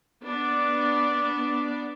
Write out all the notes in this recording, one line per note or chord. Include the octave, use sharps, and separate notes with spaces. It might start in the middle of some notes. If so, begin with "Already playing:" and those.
B3 D4 D5